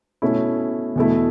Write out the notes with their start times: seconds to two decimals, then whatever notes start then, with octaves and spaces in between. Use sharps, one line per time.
0.22 B2 A3 C#4 E4
0.96 E2 B2 A3 E4